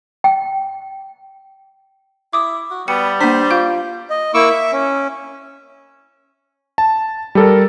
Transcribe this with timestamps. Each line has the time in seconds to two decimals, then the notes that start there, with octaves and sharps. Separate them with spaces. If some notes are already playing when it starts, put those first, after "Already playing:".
0.24 G5
2.33 E4 D6 D#6
2.71 F#4
2.88 G3 B3 G5 C#7
3.21 A#3 D4 C5 B6
3.51 F4 F5 G6
4.10 D#5
4.34 A#3 E4 C#6 D6 E6
4.50 E5
4.72 C#4
6.78 A5
7.35 G3 A4 A#4